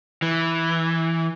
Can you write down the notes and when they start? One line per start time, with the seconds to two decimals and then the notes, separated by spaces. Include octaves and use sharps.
0.22 E3